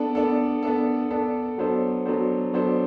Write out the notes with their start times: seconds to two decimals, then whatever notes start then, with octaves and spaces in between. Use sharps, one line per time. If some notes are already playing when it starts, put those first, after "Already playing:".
Already playing: B3 D4 A4
0.15 B3 D4 A4
0.63 B3 D4 A4
1.11 B3 D4 A4
1.58 F#3 B3 D4 A4 C5
2.06 F#3 B3 D4 A4 C5
2.53 F#3 B3 D4 A4 C5